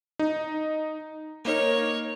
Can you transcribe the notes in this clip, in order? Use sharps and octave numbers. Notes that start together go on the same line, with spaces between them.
D#4
A#3 D#4 A#4 C#5